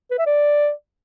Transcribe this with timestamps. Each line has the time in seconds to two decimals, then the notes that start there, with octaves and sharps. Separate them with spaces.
0.11 B4
0.18 E5
0.26 D5